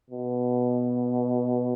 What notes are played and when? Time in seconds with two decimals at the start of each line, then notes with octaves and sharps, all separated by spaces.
0.10 B2